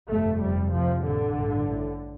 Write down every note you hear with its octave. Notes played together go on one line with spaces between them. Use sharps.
G1 F2 C3 A3
F1 F2 C3 G3
C2 C3 F3
A1 A2 D3
A1 G2
A1 A2